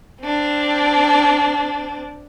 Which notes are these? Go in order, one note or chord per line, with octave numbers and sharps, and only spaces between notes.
C4 D4